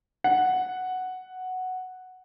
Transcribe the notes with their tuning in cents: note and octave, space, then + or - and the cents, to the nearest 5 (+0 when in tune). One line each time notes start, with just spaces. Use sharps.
F#5 +0